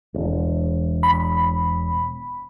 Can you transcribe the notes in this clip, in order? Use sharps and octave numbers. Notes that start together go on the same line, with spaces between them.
E1
B5